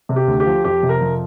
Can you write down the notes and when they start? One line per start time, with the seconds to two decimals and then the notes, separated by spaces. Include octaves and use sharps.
0.09 C3
0.16 G4
0.28 D2
0.40 G4
0.46 F3
0.64 F2 G4
0.83 C3
0.89 A#4
1.01 F2